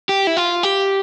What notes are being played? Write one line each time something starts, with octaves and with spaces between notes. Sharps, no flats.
G4
E4
F4
G4